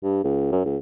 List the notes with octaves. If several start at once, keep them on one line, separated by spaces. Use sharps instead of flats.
G2
C#2
F#2
C#2